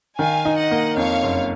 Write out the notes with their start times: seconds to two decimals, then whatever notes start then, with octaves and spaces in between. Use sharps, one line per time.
0.19 D#3 F5 G#5
0.45 D#4
0.58 D#5 F#5
0.71 A#3
0.97 F2 C#5 F5
1.23 F#1